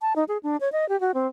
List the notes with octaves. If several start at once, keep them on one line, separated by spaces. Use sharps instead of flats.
A5
D#4
G#4
D4
C#5
D#5
G4
F#4
C4